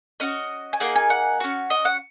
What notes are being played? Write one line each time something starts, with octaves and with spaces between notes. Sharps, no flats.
C#4 F#4 D#5
G#5
A#3 D#4 G#4 F#5
G#5
F#5
C#4 F#4
D#5
F#5